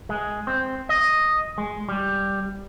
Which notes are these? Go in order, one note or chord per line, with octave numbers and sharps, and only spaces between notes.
G#3
C4
D#5
G#3
G3